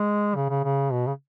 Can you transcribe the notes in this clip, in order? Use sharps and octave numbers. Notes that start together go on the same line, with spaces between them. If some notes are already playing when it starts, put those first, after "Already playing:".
Already playing: G#3
C#3
C#3
C#3
B2
C#3